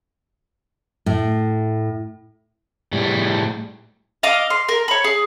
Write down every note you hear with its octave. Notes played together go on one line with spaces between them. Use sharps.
A2
A2 G3
D#5 F5 D6
C6
A#4
C#5 B5
G#4